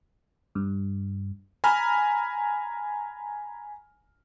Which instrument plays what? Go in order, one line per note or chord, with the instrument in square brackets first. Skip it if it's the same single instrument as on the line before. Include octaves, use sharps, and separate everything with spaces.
[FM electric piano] G2
[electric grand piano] G#5 A#5 B5 F6